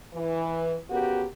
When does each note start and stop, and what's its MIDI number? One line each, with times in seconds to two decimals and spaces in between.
0.14 0.75 52
0.90 1.24 49
0.90 1.24 59
0.90 1.24 66
0.90 1.24 67
0.90 1.24 70